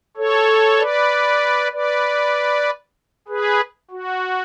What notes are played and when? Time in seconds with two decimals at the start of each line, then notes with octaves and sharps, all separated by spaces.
0.17 A4 C#5
0.78 B4 D5
1.72 B4 D5
3.28 G#4 B4
3.91 F#4